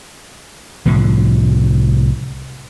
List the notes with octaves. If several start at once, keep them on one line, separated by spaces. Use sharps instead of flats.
C2 A2 D3 F3